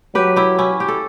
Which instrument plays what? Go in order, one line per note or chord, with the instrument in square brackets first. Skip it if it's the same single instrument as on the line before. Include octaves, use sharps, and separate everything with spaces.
[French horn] F#3 [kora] G4 B4
[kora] E4 G4
C#4 E4
G4
A4